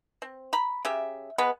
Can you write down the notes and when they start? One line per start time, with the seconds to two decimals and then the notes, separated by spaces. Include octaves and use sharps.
0.22 C4
0.53 A#5 B5
0.85 C#3 G4 E5
1.38 G#3 B3 B4